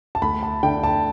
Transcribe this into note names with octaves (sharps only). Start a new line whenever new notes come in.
A5
D2 B5
A5
D3 G5
A5